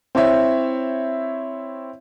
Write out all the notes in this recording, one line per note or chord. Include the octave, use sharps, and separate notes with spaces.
C4 E4 C#5 E5